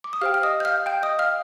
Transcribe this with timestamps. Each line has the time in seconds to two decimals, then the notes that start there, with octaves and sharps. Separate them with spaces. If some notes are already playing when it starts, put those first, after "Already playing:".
0.04 D6
0.13 D#6
0.21 G4 C5 F5 G5 F6
0.34 F6
0.43 D#5 D#6
0.60 G6
0.65 F5 F6
0.86 G5 G6
1.03 D#5 D#6
1.19 F5 F6